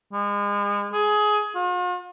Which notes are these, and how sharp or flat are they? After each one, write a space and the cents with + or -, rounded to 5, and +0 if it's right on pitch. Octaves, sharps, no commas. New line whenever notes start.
G#3 -35
G#4 +20
F4 +45